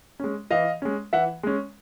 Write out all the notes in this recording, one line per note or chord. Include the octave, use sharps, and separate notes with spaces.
G#3 C#4
E3 D#5 F5
G#3 C#4
E3 E5 F#5
G#3 C#4